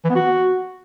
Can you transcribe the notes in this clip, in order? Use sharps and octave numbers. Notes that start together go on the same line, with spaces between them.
E3
B3
F#4